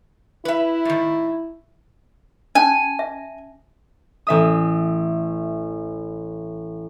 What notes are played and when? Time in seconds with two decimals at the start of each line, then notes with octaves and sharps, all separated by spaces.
0.45 E4 B4 E5
0.85 A2 D#3
2.55 C#4 G#5 A5
2.99 E5
4.27 A1 E5 D#6